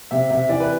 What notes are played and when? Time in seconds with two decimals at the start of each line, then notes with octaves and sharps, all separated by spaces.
0.11 C3 E5
0.30 C3 E5
0.49 E3 D5
0.60 B4